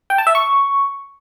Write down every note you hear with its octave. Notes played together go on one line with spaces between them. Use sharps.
G5
A5
E5
C#6